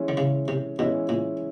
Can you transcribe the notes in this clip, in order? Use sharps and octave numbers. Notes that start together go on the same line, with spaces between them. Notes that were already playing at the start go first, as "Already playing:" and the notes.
Already playing: E3 G#3 C#4 E4
D3
C#3
C3
B2 E3 G#3 C#4 E4
A#2